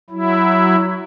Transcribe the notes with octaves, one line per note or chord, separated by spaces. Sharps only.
F#3 E4